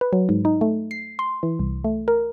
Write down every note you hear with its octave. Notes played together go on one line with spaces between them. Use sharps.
B4
F#3
G#2
D#4
A3
C7
C6
E3
C2
A3
A#4